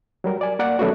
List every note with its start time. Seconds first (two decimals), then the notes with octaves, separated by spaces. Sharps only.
0.24 F#3 G3 A#4
0.41 D5 G#5
0.59 A#3 A#4 D5 F#5
0.79 D#3 F#3 A3 B3 C#4 F#4